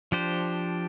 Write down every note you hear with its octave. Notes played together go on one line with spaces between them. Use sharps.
F3 D4 G4 C5